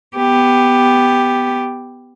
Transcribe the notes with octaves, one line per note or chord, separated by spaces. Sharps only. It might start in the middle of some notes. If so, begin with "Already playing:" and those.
B3 G4